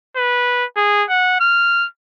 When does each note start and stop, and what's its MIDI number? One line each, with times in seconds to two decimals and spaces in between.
0.16 0.65 71
0.76 1.04 68
1.09 1.40 78
1.40 1.86 89